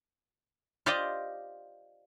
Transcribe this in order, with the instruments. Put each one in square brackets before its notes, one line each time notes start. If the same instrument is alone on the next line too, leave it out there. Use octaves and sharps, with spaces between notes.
[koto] F4 G4 C5 D5 D#5 G5